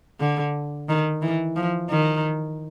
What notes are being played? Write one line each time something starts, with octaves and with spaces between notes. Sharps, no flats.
D3
D#3
E3
F3
D#3